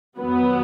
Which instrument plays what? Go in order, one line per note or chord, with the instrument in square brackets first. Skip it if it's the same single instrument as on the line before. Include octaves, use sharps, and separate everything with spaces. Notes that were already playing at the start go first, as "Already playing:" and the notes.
[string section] F2 D#3 F#3 B3